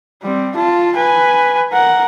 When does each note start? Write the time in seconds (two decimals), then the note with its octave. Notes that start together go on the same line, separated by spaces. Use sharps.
0.23 G3 C4
0.56 F4 A5
0.96 B4 G#5
1.72 A#4 F#5